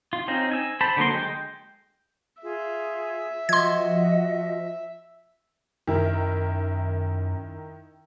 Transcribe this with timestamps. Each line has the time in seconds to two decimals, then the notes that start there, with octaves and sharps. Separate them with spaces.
0.13 F4
0.28 C4 C#4 D#4
0.51 G#5 E6
0.81 C5 A5 B5
0.97 D3 F#3 A#3 C6
1.10 G#3 G5
2.42 F4 G#4 E5
3.49 F3 F#4 D#5 C6 G#6
5.87 F#2 D#3 E4 A#4